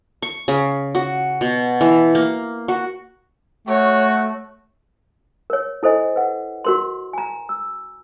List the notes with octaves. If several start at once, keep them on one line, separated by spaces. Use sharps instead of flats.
C#6
C#3
F#4
B2
E3
A#3
F#4
A3 F#4 C#5
A#4 C#5
E4 A4 C5 D#5 G#5
B4 F#5
F#4 A#4 C6
G#5 A#5
E6